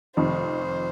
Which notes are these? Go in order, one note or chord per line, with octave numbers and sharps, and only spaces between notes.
F1 F2 D#3 C5